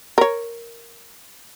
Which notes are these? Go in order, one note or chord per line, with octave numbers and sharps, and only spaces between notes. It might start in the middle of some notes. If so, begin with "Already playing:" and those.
A#4 C#5